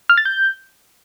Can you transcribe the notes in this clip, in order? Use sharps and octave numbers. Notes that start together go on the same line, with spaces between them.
F6
A6
G6